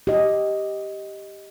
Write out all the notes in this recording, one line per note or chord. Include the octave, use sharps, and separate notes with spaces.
G4 D#5